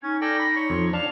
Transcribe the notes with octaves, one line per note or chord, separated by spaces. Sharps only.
C#4 D#4 G#6
A4 D5 G5 A#6
B5
C#5 C#6
F2 C6
D4 F5 A5 F7